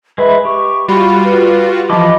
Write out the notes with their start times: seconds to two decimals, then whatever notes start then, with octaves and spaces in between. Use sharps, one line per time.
0.18 G#3 B4 E5 B5
0.45 G4 C#6
0.88 G3 F4 F#4 B5
1.24 B4
1.90 E3 F3 D#5 A5 B5 D6